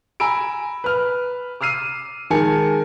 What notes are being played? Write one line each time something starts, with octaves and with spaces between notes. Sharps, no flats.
G#5 A#5 B5 E6 D7
B4 F6
D6 E6 F6 C7 D#7
D#3 G#3 A#4 G#5 A5 C#7